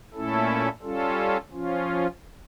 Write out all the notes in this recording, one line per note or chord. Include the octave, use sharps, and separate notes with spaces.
A#2 A3 C#4 E4 A4
G3 C#4 F4 A4
F3 C#4 F4